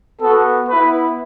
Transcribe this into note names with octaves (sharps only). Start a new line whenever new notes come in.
B3 F#4 A4
B3 E4 B4